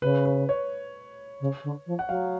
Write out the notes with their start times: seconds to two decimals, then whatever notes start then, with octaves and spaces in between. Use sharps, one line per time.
0.02 C#3 B4
0.26 B4
0.49 C#5
1.40 C#3
1.63 D3
1.86 F3
1.99 F#5
2.09 F#3 F5